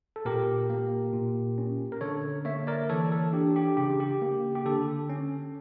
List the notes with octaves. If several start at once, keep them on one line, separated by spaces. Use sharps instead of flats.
A4
A#2 G4 A#4
A#3
A#2
C#4
A#4
D3 A4 C#5
A#3 C#5 E5
A#4 D5
E3 A4 C#5
A4
D4 G4
G4
C#3 G4
G4
A#3
G4
D3 A4
C#4